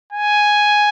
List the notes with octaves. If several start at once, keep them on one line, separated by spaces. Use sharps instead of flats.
G#5